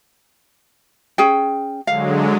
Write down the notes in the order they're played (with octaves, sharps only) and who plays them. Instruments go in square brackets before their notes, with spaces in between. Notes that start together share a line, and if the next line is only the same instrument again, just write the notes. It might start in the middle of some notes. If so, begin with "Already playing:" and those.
[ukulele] C#4 G#4 G5
[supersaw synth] D3 F#3 G#3 [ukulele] F5